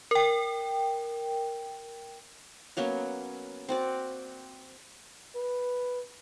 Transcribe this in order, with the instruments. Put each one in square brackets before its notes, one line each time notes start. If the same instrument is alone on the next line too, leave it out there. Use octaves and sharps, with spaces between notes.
[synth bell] A#4 G5
[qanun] F#3 A#3 B3 C#4
C4 F#4 D5
[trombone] B4